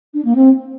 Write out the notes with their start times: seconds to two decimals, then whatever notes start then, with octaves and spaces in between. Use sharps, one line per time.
0.14 D4
0.24 A#3
0.35 C4